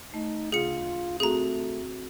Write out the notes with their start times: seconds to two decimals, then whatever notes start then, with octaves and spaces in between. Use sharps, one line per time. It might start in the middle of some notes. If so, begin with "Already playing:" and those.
0.14 A3 D#4
0.52 D2 C#3 F4 G#4 C#7
1.20 A3 C4 F#4 G#4 A#5